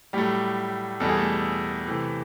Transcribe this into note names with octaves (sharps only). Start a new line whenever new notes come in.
A2 F#3 G3 A3 G4
E2 B2 G3 A4
G#4
A3 A4
C3 E3 A3